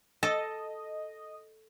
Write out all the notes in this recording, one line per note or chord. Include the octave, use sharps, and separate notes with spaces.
A4 D#5